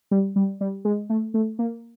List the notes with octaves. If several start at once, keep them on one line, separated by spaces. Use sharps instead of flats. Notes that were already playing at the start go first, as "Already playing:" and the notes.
G3
G3
G3
G#3
A3
A3
A#3